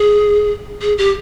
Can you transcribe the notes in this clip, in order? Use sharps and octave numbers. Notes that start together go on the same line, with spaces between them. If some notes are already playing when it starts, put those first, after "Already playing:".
Already playing: G#4
G#4
G4